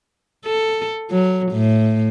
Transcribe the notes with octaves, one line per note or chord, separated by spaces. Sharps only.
A4
F#3
A2